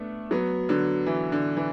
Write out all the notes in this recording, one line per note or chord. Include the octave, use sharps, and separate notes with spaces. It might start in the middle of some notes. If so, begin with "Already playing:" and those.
Already playing: A3 B3 D4
F#3 B3
D3 F#3
E3
D3
E3